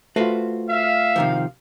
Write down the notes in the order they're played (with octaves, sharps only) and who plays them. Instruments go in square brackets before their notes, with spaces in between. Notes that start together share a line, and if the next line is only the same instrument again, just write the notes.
[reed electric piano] A3 F4 [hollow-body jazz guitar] F#4 B4 C5
[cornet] E5 [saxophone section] F5
[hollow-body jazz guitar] C3 D#3 F3